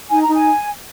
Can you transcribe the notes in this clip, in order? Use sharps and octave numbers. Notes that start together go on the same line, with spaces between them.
D#4 G#5
A#5
D#4
G#5